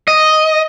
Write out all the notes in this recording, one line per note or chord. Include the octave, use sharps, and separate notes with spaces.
D#5